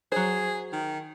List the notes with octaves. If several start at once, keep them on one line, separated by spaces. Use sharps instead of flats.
F#3 G#4 C5
D#3